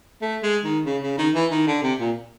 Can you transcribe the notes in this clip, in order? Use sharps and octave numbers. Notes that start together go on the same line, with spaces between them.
A3
G#3
D#3
C#3
C#3
D#3
E3
D#3
D3
C3
A#2